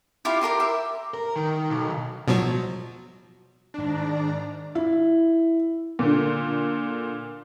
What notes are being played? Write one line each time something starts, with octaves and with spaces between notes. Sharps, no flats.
E4 F4 G4 F5
G4 A#4 D#5 C6
E5
A#4
D#3
B1
B2 F3 F#3
G#2 D#3 D4 D5 A#5
E4
A#2 D3